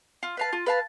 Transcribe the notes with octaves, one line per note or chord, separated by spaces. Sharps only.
F4
B4 F5 A5
F4
B4 F5 A5